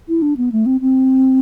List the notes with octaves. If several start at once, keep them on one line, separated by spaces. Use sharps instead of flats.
E4
D4
B3
A3
C4
C4